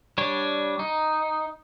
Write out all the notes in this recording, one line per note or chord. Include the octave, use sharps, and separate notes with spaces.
G3 D4 C#5
D#4